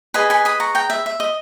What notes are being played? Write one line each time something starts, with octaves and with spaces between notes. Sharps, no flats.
G#4 B4 D#5 G#5 B5
G#5 B5
B5 D#6
A#5 C#6
G5 A#5
E5
E5
D#5